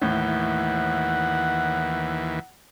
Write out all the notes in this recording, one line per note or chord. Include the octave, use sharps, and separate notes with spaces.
D#2 A2 E3 F#5